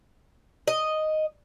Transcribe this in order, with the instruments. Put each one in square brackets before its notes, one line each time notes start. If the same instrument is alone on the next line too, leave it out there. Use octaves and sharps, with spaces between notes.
[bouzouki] D#5